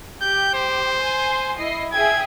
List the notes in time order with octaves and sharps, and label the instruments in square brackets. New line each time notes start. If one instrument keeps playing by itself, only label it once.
[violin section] G4 [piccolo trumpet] G6
[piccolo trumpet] C5
[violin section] G#5 C6
E4 D#5 C7
[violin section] G#4 E5 G5 [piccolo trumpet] G#6